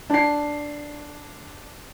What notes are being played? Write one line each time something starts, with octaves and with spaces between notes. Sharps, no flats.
D4 C7